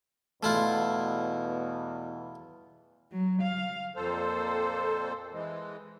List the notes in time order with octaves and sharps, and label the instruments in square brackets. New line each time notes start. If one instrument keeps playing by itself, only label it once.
[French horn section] E2 B2 [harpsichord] A3 E4 F4
[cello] F#3
F5
[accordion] F2 A#2 A4 C5
E3 G#3